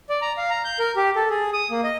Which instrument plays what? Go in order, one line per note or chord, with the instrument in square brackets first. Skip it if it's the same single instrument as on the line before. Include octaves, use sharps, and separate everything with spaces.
[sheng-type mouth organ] D5
A#5
F5
A#5
G6
A#4
G4
A4
G#4
D#6
A#3
D#5